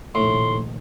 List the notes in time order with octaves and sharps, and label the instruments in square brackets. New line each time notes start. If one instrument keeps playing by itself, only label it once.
[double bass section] F1 A#1 D#3 [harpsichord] A2 [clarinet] C6